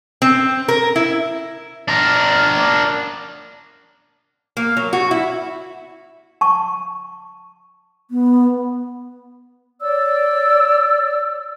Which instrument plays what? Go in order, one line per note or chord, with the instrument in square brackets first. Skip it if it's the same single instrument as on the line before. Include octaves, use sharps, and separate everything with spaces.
[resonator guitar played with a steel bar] C4
A#4
E4
[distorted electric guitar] D4 A#4
[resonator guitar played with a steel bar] A#3
F#3
F#4
E4
[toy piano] A5 C#6
[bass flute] B3
[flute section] C#5 D5 E6